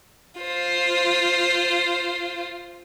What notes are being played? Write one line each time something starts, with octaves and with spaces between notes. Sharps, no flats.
F4 C5